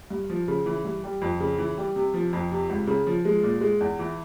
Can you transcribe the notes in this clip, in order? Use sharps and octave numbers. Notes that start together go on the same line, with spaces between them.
G2
F3
C#3
E3
G2
G3
F2
C#3
E3
G3
C3
F3
F2
C3
C#2
C#3
F3
G#3
A#2
G#3
E2
E3